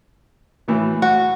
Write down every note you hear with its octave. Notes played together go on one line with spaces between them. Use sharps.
A2 E3 F#3
F#4